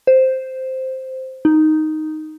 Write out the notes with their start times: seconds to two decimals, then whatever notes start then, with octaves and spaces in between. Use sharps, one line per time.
0.07 C5
1.45 D#4